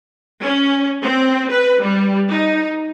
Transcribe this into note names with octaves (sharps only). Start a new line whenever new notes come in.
C#4
C4
B4
G3
D#4